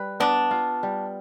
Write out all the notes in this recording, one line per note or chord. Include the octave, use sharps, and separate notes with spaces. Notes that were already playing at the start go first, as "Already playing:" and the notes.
Already playing: G3 B4
B3 D4
F4
G3